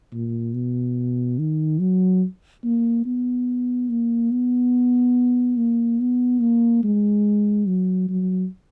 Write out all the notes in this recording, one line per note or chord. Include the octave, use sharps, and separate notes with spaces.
A#2
B2
D#3
F#3
A#3
B3
A#3
B3
A#3
B3
A#3
G#3
F#3
F#3